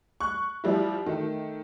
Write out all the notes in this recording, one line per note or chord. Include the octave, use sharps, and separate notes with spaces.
C#6 F#6
F3 G3 E4
D#3 A3